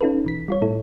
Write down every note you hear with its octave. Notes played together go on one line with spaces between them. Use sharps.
C#4 D#4 F4 A4 B4
B1 E3 B6
G3 F4 C#5
A2 E4 A4